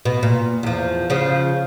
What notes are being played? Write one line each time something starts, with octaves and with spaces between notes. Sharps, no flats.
B2
A#2
E2 F3
C#3 F3